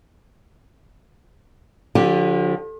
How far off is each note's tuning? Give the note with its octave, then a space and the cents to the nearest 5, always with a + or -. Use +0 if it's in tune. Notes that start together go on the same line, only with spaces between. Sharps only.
D3 +0 F3 +40 G4 -5